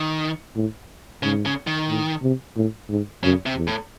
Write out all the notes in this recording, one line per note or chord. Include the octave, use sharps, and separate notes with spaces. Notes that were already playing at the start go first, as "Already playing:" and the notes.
Already playing: D#3
A2
G#2 C#3
C#3
D#3
A2
C3
A2
G#2
F#2 C#3
C3
E2
A2